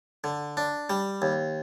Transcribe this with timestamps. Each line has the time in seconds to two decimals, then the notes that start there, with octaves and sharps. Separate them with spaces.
0.24 D3
0.57 D4
0.90 G3
1.22 D#2